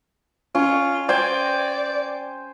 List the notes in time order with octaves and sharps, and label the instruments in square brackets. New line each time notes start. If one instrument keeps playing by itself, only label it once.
[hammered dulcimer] C#4 [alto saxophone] F4
[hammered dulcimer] C5 G5 G#5 [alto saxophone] D5